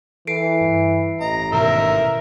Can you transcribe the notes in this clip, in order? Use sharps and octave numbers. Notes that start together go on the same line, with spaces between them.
E3 A4 C7 D7
G2
A1 D#5 A#5
G#2 B2 D#3 A#4 E5